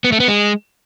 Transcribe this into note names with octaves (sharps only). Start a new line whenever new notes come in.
B3
A3
B3
G#3